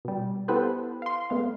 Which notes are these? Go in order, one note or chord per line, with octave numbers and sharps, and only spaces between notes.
B2 G3
B3 E4 G4 A4 B4 C5
F5 C6
G#3 A3 B3 F5